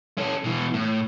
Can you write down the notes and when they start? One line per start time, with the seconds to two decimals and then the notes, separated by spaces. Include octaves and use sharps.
0.18 C#4 A4
0.44 B2 E3
0.74 A2